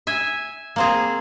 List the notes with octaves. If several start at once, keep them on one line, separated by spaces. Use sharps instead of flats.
E5 G#5
A#3 C4 G#4